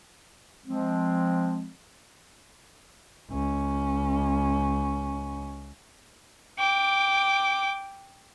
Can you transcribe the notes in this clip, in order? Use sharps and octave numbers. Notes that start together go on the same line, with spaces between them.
F3 G#3 C4
C#2 C#4
G5 D6